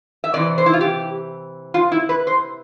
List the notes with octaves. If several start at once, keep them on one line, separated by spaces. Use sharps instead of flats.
E5
C3 E3 D5
C5
E4
F4
G4
F4
E4
B4
C5